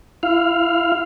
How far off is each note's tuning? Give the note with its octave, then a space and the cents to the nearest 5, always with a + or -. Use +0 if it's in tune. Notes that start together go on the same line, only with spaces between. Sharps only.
E4 +30 F5 +0